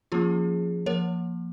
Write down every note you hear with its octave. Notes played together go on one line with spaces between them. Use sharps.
F3 A#3 C#4 F4 G#4
F3 A#3 A#4 C#5